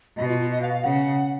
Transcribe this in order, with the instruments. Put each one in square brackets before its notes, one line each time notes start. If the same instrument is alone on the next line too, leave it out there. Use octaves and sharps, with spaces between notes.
[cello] B2 [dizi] D#5
[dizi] F4
F4
D#5
F5
F5
[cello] C#3 [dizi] F#5